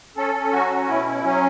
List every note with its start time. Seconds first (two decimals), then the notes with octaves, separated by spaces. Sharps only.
0.17 C#4 A4
0.35 C#4
0.52 F#3 F#4
0.70 C#4
0.88 B2 E4
1.06 C#4
1.24 F#3 C#4